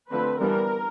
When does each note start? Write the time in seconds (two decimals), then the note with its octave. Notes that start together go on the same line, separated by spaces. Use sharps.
0.10 D3 F3 A3 C4 B4
0.40 E3 G3 B3 D4 A#4